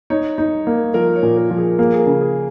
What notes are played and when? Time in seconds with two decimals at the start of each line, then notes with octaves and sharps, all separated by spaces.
0.10 D#4 C#5
0.38 D#4
0.67 A#3
0.94 F3 A#4
1.16 C#5
1.23 A#2
1.37 A#4
1.50 F3
1.57 G#4
1.79 A#3 G#4
1.93 G#4
1.99 A#4
2.07 C#3
2.21 G#4